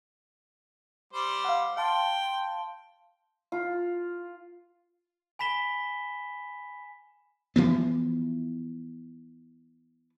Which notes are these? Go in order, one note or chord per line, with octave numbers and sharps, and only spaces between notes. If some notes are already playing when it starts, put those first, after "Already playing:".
G3 C5
F5 F#5
F5 G5 A5 C6
F4
G#5 B5 B6 E7 G7
E3 F3 B3